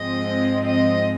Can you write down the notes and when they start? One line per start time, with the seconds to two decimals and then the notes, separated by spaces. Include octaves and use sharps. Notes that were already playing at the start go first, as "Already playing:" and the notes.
Already playing: G#2 F3 G#3 C4 D#5
0.63 D#5